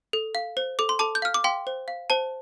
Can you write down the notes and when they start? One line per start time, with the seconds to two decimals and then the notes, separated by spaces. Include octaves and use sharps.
0.13 A4
0.35 F5
0.57 C5
0.79 A4 D6
0.89 C6
0.99 A4 A5 D6
1.15 G6
1.22 F5 F6
1.34 D6
1.44 F5 G5 C6
1.67 C5
1.88 F5
2.10 C5 A5